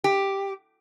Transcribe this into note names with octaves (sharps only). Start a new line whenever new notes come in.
G4